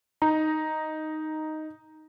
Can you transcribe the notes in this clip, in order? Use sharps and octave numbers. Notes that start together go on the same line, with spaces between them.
D#4 A#5